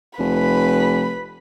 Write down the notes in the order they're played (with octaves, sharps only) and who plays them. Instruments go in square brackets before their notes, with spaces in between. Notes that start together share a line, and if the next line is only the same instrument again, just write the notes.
[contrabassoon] F1 [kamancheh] B4 B5